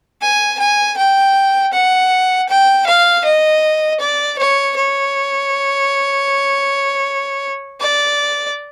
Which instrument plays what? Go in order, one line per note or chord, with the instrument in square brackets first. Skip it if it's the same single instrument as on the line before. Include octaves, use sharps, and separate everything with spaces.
[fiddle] G#5
G#5
G5
F#5
G5
F5
D#5
D5
C#5
C#5
D5